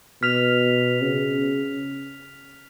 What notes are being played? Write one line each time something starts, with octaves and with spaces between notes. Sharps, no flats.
B2 F6 B6 F7
C#3